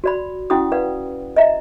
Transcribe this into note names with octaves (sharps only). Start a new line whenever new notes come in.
F#4 D5 B5
C#4 E4 F#4 F#5 G5 D#6
B4 D5 F5 F#5
D#5 E5 A#5